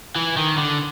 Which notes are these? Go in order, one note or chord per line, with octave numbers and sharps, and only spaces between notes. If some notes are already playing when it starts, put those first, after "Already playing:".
E3
D#3
D3